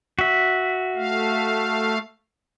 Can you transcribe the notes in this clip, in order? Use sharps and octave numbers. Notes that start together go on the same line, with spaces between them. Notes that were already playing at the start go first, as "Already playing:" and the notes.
F#4 E5
A3 F5